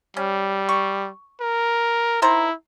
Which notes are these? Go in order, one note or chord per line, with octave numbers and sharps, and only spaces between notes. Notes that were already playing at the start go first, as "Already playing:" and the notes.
G3 C#4
C#6
A#4
D#3 E4 C5 A#5